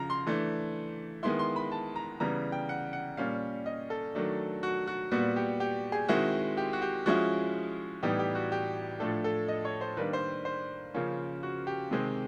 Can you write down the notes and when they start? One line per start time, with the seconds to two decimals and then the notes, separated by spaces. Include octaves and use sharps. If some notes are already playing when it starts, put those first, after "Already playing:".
Already playing: C#3 F3 A#5
0.10 C6
0.27 E3 A3 D4
1.23 D#3 G#3 B3 E4 C6
1.39 C6
1.56 B5
1.72 A5
1.96 A#5
2.20 C#3 E3 G3 B3 A#5
2.52 G5
2.69 F#5
2.93 F#5
3.17 A#2 G3 A#3 C#4 F5
3.66 D#5
3.90 A4
4.15 D#3 F#3 A3 D4
4.63 F#4
4.87 F#4
5.11 A#2 G3 B3 F#4
5.36 G4
5.60 G4
5.92 G#4
6.08 D#3 G#3 C4 E4 F#4
6.57 G4
6.73 F#4
6.82 G4
7.06 F3 G#3 C#4 E4 F#4
8.03 A2 E3 G3 B3 D#4 G4
8.19 G4
8.35 F#4
8.52 G4
9.00 A2 F3 A3 D4 A4
9.24 A4
9.48 D#5
9.65 C#5
9.81 C5
9.97 D#3 G3 A#3 D4 B4
10.13 C5
10.45 C5
10.95 C#3 F3 A#3 C#4
11.43 F#4
11.67 G4
11.91 C3 D#3 G#3 C4